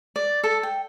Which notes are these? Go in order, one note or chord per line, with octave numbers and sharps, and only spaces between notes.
D5
A4
G5